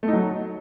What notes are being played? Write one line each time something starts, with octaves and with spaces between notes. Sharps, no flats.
A3
D#4
F#3